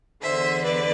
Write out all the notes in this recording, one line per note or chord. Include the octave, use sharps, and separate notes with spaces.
E2 D3 C5 E5
B4 D5